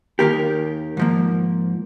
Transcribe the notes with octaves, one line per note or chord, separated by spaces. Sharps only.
D#2 D#3 A#3 G4 A#4
G#2 F3 A#3